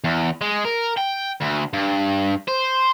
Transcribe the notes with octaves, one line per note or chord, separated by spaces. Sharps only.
E2
G#3
A#4
G5
D2
G2
C5